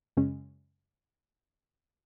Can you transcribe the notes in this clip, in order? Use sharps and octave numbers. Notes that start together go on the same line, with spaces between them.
F#2 C#3 G#3 C#4